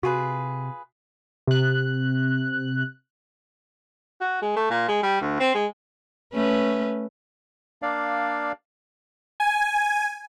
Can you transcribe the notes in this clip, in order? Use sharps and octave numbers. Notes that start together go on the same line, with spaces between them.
C3 F4 F#4 G#4 B4
C3 F#6
F#4
G#3
A3
A#2
G#3
G3
D2
C4
G#3
A3 C#4 B4
A#3 D4 D5 F5
G#5